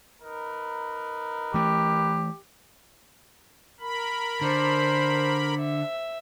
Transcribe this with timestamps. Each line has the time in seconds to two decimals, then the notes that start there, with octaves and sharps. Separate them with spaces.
0.22 D#4 A#4 B4
1.54 E3 A3 G4
3.80 A#4 B5
4.41 D3 C5
5.59 E5